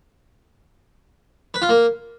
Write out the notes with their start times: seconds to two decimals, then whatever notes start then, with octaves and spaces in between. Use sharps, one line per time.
1.54 B4
1.62 F4
1.69 A#3